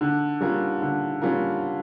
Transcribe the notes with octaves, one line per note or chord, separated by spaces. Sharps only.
D3
G3 C#4 F4 A#4
D3
G3 C#4 F4 A#4